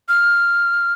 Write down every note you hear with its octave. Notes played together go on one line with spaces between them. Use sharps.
F6